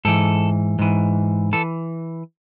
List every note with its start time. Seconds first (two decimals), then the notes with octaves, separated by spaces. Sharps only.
0.05 G#2 E3 A4
0.79 G#2 E3
1.53 E3 A4